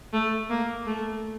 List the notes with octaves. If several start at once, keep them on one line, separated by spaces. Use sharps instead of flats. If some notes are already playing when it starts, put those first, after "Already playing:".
A3
A#3
A3